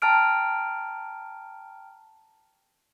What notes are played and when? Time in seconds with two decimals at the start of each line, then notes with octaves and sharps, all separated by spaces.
0.02 G5 A5 A#5 F6 D7